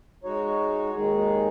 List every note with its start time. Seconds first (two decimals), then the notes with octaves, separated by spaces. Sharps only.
0.24 G#3 D#4 F#4 C#5
0.93 D#2 D#3 G#3 D#4 G#4